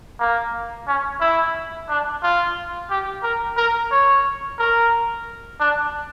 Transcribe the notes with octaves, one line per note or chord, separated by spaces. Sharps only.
A#3
C#4
E4
D4
F4
G4
A#4
A#4
C#5
A#4
D4